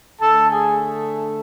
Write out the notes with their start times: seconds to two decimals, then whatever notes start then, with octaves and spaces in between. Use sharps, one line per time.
0.20 D3 A3 A4 A5
0.50 G#4 G#5